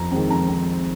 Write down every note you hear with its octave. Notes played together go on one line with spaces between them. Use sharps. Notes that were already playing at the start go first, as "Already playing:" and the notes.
Already playing: F2 A#5
D#3 G#3 C4
F2 A#5
C4